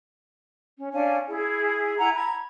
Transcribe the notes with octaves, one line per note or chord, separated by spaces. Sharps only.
C#4
C#4 D4 F5 G#5
E4 G#4
E4 F#5 G#5 A#5
A#5 B5 G#6